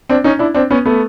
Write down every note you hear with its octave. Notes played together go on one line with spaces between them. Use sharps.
C4 D4
C#4 D#4
D4 E4
C4 D4
B3 C#4
A3 B3